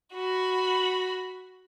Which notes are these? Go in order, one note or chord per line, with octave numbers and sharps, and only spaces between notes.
F#4 B5